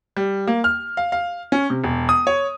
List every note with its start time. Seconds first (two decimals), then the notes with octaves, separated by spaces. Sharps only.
0.17 G3
0.47 A#3
0.64 F6
0.97 F5
1.12 F5
1.52 C#4
1.70 C3
1.83 E1
2.09 D#6
2.27 C#5